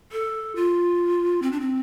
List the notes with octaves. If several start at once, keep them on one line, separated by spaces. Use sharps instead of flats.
A4
F4
C4
D4
C4